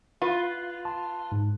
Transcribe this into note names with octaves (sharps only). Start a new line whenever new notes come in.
F4 B4
A5 C6
G#2